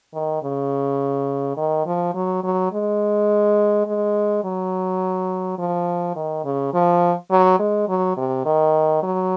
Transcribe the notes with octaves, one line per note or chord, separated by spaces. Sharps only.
D#3
C#3
D#3
F3
F#3
F#3
G#3
G#3
F#3
F3
D#3
C#3
F3
F#3
G#3
F#3
C3
D#3
F#3